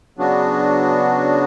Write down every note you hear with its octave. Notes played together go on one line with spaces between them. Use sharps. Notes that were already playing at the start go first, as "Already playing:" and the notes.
C#3 F#3 B3 D4 F#4